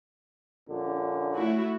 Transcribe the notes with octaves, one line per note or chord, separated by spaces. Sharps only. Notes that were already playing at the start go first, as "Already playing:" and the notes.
A#1 D3 C#4
A3 E4 F#4